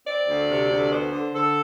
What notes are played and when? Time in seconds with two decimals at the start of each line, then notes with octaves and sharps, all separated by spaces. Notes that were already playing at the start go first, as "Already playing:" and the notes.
0.06 C4 D5
0.27 D2
0.48 C3
0.70 D2
0.91 B3 C5
1.12 D3
1.33 D3 A4